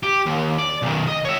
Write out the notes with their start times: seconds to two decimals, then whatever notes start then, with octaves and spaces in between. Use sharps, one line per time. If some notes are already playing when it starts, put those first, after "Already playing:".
0.03 G4
0.26 D#2
0.58 D5
0.82 B1 D#3
1.08 D#5
1.25 C#5 E5